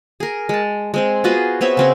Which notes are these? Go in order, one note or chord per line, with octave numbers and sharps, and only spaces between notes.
G#4 A#4
G#3 A5
G#3 C4 G#4
B3 F4 F#4 G#4
B3 C4 C#5 E5
C#3 C4 A#4